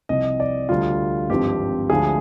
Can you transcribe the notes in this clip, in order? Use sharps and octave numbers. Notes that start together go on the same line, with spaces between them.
C2 C3 F3 D#5
D5
D2 D3 G3 F4
G#1 G2 F3 C4 G4
D2 D3 F3 G#3 D4 G#4